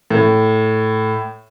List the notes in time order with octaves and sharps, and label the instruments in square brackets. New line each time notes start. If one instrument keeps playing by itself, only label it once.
[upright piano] A2